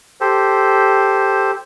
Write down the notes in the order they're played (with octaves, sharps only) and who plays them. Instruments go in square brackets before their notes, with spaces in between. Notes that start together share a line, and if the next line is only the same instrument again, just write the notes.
[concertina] G4 A4 C5